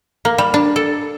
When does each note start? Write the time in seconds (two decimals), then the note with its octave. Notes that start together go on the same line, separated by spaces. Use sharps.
0.25 A#3
0.38 G3
0.54 D4
0.76 A4